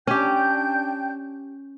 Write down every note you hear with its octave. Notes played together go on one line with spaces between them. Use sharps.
C#4 D4 G4 G5 G6